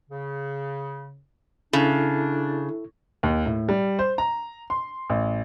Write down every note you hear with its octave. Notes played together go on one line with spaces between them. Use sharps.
C#3
C#3 D4 E4 A4
D#2
A2
G3
C5
A#5
C6
A1